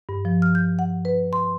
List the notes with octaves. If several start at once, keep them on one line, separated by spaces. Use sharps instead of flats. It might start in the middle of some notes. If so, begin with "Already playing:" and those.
G2
F3
F6
G6
F#5
B4
C6